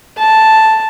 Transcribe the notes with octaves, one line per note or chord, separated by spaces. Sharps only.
A5